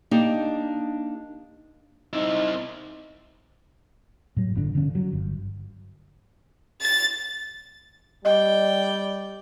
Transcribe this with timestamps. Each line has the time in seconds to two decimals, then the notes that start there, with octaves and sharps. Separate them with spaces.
0.11 A#3 D4 D#4 G4
2.13 C4 D#4 E4
4.37 A2 F#3
4.55 G1 D3 D4
4.75 D3 F3 C#4
4.95 F#3
5.13 G1
6.82 A6
8.25 G3 D5 D#5 G5